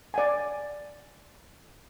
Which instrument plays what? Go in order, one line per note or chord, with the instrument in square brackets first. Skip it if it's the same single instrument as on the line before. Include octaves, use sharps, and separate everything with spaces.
[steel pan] D5 F#5 G#5